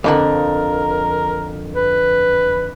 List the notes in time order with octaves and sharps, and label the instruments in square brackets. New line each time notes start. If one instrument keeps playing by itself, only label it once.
[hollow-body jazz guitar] F2 D3 F#5 [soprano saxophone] A#4
[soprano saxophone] B4